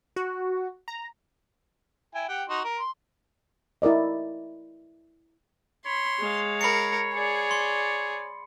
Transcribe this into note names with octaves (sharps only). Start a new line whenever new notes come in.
F#4
A#5
E4 G5 G#5
G4 F#5 G5
D#4 F#4 C6
A#4
C6
E4 A#4 D5 D#5
C#5 B5 C6
G#3 F5
A#4 B5 C7 C#7
G#4 D5
C6